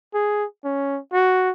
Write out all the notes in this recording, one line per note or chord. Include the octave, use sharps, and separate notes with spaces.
G#4
C#4
F#4